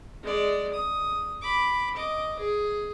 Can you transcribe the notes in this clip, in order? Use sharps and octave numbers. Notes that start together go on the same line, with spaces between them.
G#3 D5
D#6
B5 D6
D#5 D6
G#4